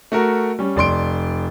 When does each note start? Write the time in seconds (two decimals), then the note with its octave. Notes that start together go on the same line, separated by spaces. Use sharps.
0.12 A3 F#4 A#4
0.59 G3 C#4
0.76 F1 D5 C6 D7